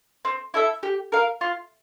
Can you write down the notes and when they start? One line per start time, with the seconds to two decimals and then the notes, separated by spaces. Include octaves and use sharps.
0.25 C4
0.54 E4 A4 E5
0.83 G4
1.12 A#4 F5
1.41 F4